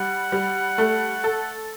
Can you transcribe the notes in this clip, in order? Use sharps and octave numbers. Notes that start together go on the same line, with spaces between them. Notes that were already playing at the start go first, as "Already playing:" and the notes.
Already playing: G3 F#5
G3
A3
A4